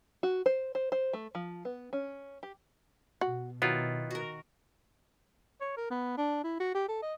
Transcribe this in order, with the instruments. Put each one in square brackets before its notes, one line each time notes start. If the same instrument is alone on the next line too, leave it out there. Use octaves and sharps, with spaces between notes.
[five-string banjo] F#4
C5
C5
C5
A3
F3
B3
C#4
G4
[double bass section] B2 [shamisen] F#4
[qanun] D#3 [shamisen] F#3 [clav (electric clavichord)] B3 E4 F4
[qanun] F#4 A#4
[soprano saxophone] C#5
A#4
B3
D4
E4
F#4
G4
A4
D#5